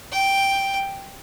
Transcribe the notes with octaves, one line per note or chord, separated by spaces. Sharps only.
G5